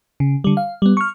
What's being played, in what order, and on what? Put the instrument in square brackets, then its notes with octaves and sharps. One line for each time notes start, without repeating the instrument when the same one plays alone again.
[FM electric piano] C#3
D3 G3
F5
G3 B3
C#6 F6